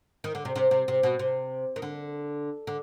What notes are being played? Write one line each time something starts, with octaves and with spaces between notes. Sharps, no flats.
D#3
D3
C3
C3
C3
C3
B2
C3
D#3
D3
D3